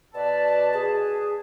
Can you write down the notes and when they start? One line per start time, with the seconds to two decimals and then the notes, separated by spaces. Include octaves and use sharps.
0.15 B2 B4 D5 A5
0.74 G#4